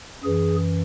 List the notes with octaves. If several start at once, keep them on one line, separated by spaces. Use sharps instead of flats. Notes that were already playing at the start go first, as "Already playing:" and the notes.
F#2 E3 G#4